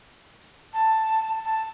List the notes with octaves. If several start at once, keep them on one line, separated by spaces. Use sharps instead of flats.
A5
A5